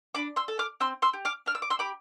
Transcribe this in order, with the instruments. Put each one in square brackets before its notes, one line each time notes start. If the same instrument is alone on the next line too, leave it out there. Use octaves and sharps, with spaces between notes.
[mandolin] D4 B5 D6
C6 E6
A4
D6 F6
C4 C6 E6
C6 E6
G4
D6 F6
D4 F6
E6
D6
C6 E6
G4 B5 D6